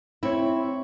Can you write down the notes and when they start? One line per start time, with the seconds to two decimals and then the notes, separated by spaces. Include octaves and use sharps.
0.23 C4 E4 C#5